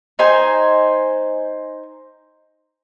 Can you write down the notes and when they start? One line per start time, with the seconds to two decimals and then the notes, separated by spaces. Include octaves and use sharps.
0.19 D#4 C5 G#5